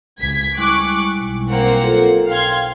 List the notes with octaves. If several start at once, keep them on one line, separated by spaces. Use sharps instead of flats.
C#2 G#6 B6
G3 G#3 E4 C#6 D6 F#6
B1
A#3 C4 F#5
F4 A4 C5
F5 G5 C6 G#6